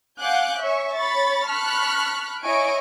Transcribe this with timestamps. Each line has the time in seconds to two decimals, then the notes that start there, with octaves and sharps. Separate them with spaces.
0.20 F5 F#5 G#5 D6 F#6 G6
0.60 C#5 E5 G#5 C#6
0.94 C#5 B5 C#6 A6
1.48 A5 B5 C#6 F6 F#6 B6
2.42 E4 C#5 D#5 G#5 C#6 D7